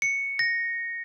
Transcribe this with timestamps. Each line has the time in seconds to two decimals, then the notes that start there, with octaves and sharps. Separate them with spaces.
0.02 C#7
0.39 A#6